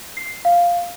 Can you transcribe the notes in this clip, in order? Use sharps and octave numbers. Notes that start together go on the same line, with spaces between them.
C7
F5